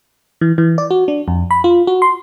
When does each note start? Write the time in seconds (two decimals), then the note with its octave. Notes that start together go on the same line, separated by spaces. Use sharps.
0.41 E3
0.58 E3
0.78 D5
0.91 F#4
1.08 D4
1.28 F2
1.51 B5
1.64 F4
1.87 F#4
2.02 C6